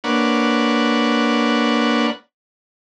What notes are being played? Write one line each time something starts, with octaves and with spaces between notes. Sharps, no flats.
A#3 D4 B4 C#5 F#5